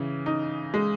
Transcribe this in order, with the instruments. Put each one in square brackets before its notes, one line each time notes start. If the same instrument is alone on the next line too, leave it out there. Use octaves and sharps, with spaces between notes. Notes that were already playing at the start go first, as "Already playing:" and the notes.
Already playing: [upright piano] C#3 E3
D#4
G#3